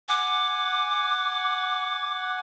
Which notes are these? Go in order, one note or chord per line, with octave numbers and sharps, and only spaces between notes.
F#5 G#5 D6